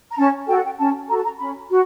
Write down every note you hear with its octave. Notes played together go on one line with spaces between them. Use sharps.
A#5
C#4 A5
F#4 A4 G5
F#5
G5
C#4 A5
F#4 A4 A#5
A5
A#5
C#4 B5
F#4